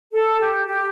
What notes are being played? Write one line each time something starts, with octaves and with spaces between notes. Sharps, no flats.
A4
G4
G4